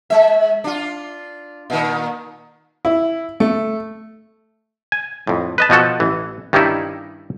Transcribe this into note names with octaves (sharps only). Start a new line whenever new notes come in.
G#3 E5
D4 F4
A#2 D#3
E4
A3
G#5
F2 A2
B4 D#5 A5
B2 F3 F#4 A4
A1 E3
G2 D#3 G3 C#4 D#4 E4